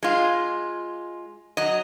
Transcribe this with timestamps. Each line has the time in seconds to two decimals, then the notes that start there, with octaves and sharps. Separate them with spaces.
0.03 G#3 F4
1.57 F#3 D#5